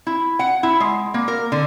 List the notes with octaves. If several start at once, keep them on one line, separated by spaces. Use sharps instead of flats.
E4
F#5
E4
G#3
A#3
A#4
D3